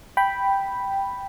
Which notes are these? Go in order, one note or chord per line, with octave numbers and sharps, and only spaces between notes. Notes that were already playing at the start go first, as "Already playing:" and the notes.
G5 B5